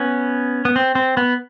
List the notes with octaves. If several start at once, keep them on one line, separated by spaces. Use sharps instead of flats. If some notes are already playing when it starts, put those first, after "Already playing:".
Already playing: B3 C#4
B3
C4
C4
B3